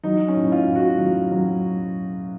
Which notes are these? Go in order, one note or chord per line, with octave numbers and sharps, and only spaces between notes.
F#3 D#4
C#4
A2
F4
A2
F#4
F#3
F#3